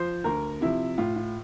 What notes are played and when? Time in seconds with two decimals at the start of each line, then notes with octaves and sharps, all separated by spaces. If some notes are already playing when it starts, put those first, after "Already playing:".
Already playing: F3 C5
0.24 D2 A#4
0.61 C3 F3 E4
0.98 A2 F4
1.16 F4